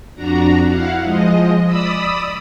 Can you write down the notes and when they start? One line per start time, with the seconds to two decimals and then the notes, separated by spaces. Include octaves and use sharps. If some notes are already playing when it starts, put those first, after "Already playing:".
0.15 F2 D4 F#4 A#5
0.67 E4 F5 F#5
1.03 F3 G#3 D#5
1.65 D5 B5 D#6 E6